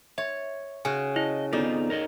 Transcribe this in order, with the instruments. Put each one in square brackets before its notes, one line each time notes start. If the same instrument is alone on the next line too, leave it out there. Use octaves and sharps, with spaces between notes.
[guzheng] C#5 [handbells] E5
[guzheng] C#3 F#4 [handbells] G#5
[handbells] E4 [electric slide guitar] D#5
[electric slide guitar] B3 C4 F4 [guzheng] D#4 [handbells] A4 D5
[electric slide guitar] A#4 C#5 D#5